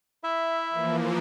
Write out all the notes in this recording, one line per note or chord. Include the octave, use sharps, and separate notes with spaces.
E4 E5
E3 F3 A#3